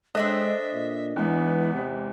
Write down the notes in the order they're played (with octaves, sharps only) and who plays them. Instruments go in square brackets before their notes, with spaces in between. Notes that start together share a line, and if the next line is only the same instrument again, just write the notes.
[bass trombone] G#3 [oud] C4 D4 A4 [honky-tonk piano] D#5 D#6 F#6 [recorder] E5
[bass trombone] A#2
[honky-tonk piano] E2 G#2 [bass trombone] E3 [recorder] B3
[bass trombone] C3